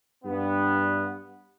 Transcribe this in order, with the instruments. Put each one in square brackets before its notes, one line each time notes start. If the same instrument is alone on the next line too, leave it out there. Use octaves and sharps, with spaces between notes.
[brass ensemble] G2 B3